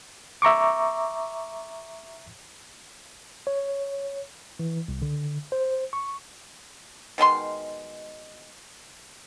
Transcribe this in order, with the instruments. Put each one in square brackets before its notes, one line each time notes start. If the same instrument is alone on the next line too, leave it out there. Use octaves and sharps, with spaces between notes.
[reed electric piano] E5 A#5 C#6 D6
[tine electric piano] C#5
E3
C2
D3
C5
C#6
[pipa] B2 D#3 G#3 C6